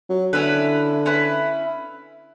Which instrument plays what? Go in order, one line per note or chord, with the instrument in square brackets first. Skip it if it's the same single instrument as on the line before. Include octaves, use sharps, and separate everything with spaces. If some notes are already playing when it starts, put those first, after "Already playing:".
[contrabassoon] F#3
[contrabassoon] D3 [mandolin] C#4 E4 B4
[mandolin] C#4 E4 B4